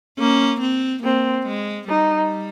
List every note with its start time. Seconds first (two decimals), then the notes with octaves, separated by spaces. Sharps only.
0.19 A#3 C#4
0.61 C4
1.03 A#3 C4
1.47 G#3
1.89 G3 D#4